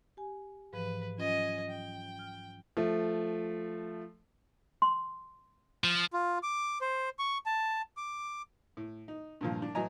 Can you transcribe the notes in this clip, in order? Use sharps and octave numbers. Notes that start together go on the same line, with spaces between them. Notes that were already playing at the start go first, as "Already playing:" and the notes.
G4 G#5
G#2 E3 F3 B4
F#3 C#4 F4 D#5 G#5
G5
F6
F3 A3
C6
F3
F4
D6
C5
C#6
A5
D6
A2
D#4
G2 A#2 F3
D4
A2 E3 F#3 D#5 G#5 A#5